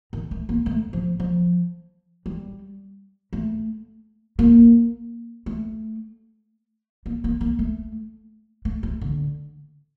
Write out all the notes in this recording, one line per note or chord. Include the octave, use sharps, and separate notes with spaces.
D#3
A3
A#3
A3
F3
F3
G3
A3
A#3
A3
A#3
A#3
A#3
A3
A3
A3
D3